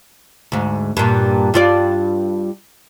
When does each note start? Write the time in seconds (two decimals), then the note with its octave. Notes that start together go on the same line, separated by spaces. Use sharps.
0.52 D2 G#2
0.97 G2 A#2
1.54 G2 F4 D5